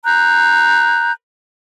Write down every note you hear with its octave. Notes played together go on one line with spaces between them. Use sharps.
A#5 F#6 G6